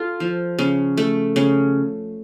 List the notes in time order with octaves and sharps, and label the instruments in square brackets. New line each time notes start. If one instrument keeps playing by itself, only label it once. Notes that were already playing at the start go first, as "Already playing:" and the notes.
Already playing: [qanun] F4 A4
F3
C#3
A3
C#3